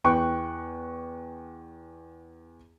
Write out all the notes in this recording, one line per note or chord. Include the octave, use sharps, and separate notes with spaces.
E2 G5 C#6 F#6